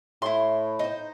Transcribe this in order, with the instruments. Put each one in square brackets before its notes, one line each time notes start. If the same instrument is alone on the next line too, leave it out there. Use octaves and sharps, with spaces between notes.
[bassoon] A2 [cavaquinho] E4 C6
[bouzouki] D#4 C5